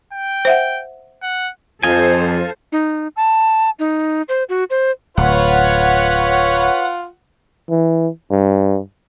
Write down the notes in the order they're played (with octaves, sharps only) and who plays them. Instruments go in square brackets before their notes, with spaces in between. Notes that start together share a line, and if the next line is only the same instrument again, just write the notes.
[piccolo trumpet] G5
[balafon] C5 E5 F#5
[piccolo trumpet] F#5
[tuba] F2 [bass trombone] F3 [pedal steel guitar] F4 D#5 G#5 [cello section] A4 C5
[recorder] D#4
A5
D#4
C5
F#4
C5
[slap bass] D1 [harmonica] F4 [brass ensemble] B4 C#5 [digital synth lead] F#5
[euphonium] E3
G2